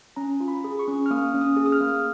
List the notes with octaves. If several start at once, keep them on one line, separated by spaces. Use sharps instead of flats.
C#4 A#5
F4
B5
G#4
C#6
C#4
F6
A#3 D#6
C#4
D#6
G#4
D#6
F6
A#3